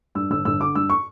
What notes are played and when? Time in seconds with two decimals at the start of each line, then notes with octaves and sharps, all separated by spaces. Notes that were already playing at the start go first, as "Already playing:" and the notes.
0.15 G2 E6
0.31 G1 E6
0.45 G1 E6
0.60 D3 D6
0.75 G2 E6
0.90 C#6